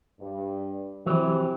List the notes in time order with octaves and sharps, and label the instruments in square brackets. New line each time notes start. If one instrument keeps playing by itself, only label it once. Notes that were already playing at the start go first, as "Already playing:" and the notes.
[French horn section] G2
[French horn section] C3 [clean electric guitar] E3 F#3